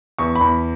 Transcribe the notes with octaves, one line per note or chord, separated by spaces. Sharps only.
E2 C#6
B5
E2